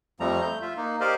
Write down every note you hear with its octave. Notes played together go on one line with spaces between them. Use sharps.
F2 F3 G3 A3 A#5
A3 G6
F4 E5
A#3 D#4
G4 A#4 C5 D5 D#5 F5